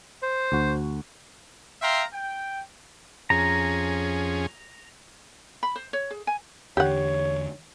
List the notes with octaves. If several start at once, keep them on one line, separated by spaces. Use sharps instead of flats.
C5
D2 F#4
E5 F5 G5 A#5 C6
G5
F2 C#4 G#4 A#5
B5
C5
C#5
G#4
G#5
E2 D3 G4 C#5 F#5